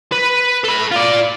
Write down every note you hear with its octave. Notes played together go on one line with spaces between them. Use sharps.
B4
A4 B5
F4 D5